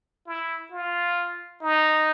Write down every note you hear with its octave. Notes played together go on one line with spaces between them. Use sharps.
E4
F4
D#4